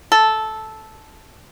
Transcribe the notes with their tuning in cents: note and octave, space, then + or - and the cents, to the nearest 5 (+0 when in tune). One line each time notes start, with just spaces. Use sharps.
A4 -10